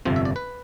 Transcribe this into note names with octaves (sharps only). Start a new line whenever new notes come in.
G1 F2 C3 F3 C5
E5
D5
B4